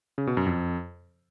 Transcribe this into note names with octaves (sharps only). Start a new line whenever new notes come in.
C#3
B2
F#2
F2